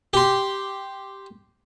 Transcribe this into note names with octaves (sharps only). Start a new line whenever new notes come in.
G4 C6